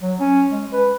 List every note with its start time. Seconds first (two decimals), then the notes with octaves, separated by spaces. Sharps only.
0.02 F#3
0.20 C#4
0.51 G#3
0.73 B4